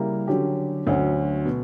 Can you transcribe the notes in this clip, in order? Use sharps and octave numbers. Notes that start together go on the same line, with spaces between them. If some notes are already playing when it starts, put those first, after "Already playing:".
Already playing: C#3 G3 A#3 E4 A#4
D3 F#3 C#4 G4
D2 D3 F#3 C#4
B2